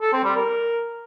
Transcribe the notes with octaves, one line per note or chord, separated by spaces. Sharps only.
A4
C4
G3
A#4